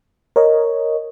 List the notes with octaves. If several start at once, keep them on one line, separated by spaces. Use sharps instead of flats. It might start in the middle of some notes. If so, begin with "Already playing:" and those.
A#4 C#5 D#5